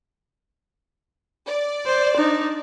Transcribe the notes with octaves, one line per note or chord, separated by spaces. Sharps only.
D5
C5
D4 D#4